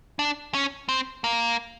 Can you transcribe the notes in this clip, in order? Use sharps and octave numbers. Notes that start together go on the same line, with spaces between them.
D4
C#4
C4
A#3